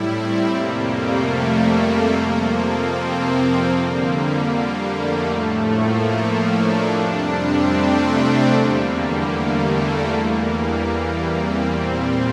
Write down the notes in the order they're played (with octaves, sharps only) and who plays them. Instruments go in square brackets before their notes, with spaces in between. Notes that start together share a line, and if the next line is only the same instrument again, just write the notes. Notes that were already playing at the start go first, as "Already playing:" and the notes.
Already playing: [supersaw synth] A2 G3 E4
C4
F2 C3 G3 A#3
A3
A#3
F2 C3 F3
C4
F2 D3 G3 A#3
A3
A2 F3 A3
A#3
D4
F2 C3 G3
C4
A3
E2 D3 G3 A#3
A#3
A3
E2 E3 G3 A#3
C4
A#2 G3